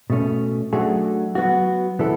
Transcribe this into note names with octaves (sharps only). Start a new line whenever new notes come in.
B2 A3 C#4
F#3 A3 D4 G#4
F#3 B3 F#4
E3 B3 E4 A4